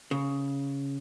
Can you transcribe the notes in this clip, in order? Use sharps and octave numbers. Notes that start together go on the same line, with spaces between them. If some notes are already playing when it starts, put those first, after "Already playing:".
C#3